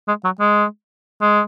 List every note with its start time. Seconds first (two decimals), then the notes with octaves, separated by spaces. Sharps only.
0.08 G#3
0.24 F#3
0.40 G#3
1.21 G#3